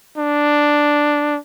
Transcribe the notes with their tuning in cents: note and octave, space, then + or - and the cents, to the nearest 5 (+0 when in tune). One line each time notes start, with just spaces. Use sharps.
D4 +0